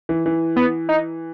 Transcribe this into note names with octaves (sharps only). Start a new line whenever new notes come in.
E3
E3
B3
D#4